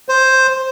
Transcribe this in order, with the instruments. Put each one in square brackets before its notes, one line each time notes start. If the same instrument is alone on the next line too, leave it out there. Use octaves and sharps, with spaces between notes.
[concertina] C5